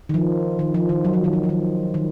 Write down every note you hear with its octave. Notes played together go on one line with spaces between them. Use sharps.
D#3
F3
D#3
F3
D#3
F#3
F3
D#3
F3
F3
D#3
D#3